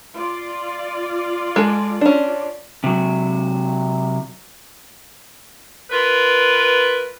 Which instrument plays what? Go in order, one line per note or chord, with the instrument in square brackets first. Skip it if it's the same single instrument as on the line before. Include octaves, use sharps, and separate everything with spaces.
[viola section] F4 D5
[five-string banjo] G#3 A4
C#4 D4
[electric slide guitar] C3 F#3
[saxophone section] F4 A#4 B4